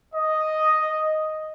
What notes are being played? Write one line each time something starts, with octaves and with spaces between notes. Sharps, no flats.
D#5